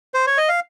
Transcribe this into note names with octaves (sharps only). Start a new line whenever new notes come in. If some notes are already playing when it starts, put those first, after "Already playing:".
C5
C#5
D#5
F5